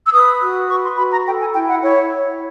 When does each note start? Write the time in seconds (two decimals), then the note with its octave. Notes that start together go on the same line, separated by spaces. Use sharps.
0.06 E6
0.13 B4 D#6
0.41 F#4
0.68 B4 C#6
0.83 C6
0.97 F#4 B5
1.11 A#5
1.25 A4 G5
1.39 G#5
1.54 E4 G5
1.67 F#5
1.82 E4 C#5
2.10 C#5